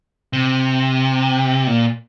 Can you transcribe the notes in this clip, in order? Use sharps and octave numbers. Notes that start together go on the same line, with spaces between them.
C3
A#2